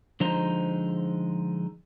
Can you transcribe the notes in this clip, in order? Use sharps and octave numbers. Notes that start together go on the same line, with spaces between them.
D3 F3 G#3 D#4 C5 A#5